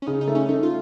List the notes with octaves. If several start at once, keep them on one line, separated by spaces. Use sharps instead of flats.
C#4
C#3 D#4
D#4
A3
C#4
A3 D#4
F4